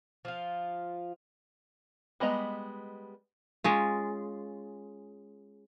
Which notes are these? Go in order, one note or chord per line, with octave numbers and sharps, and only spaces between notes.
F3 F4
G3 G#3 B3 D#5 A#5
G#3 C#4 F4